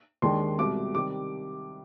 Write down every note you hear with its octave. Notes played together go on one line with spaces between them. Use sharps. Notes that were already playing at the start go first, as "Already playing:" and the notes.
D#2 D#3 G#3 D4 C6
C2 B2 G#3 D6
C3 D#3 G3 D6